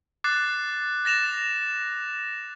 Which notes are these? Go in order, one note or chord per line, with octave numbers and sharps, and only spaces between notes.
D6 F#6 A6 C7
A6 A#6 E7 F7